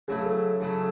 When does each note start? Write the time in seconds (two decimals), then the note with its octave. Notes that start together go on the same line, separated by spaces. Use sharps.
0.08 C#3 F#3 A3 E4 G#4
0.26 A4
0.60 C#3 F#3 A3 E4